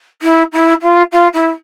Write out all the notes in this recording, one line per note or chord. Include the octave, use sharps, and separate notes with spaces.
E4
E4
F4
F4
E4